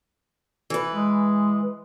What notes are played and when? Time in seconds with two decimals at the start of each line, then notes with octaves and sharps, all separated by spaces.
0.70 E3 B4
0.93 G#3